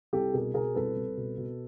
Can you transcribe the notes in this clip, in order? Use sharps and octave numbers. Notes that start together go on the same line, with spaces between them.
C2 G4 A4
B2 G#4 A#4
B2 G#4 A#4
C2 A4 B4
C2
B2
B2